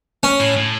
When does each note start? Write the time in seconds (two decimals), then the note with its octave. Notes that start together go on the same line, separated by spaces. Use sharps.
0.23 C#4
0.40 A2
0.56 A2